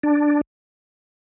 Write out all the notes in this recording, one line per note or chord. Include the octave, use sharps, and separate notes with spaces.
D4